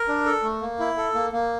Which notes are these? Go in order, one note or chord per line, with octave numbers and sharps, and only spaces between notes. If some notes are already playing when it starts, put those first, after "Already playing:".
Already playing: A#4
D4
A4
A3
A#3
E4
A4
A#3
A#3